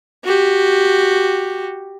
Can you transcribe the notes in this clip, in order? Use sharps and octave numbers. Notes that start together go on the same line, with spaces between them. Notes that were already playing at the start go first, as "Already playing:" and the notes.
F#4 G4